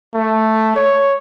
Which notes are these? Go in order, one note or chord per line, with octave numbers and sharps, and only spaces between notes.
A3
C#5